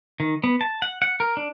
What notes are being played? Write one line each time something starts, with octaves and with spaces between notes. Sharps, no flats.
D#3
B3
A5
F#5
F#5
A#4
D4